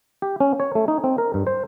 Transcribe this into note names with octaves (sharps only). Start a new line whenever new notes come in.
G4
C#4
C#5
A3
D#4
C4
A#4
G2
C5